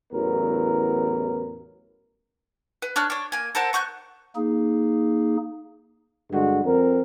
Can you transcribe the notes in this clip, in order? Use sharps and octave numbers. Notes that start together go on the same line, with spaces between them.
A1 E2 F#3 B3 A#4
B4
D4 C#5 F6 F#6
D4 C#5
A#3 G#5
A4 A#4 C5 F#5
B3 C#6 F#6 G6
A#3 D#4 G#4
G2 D3 G#3 F#4
F2 C4 A#4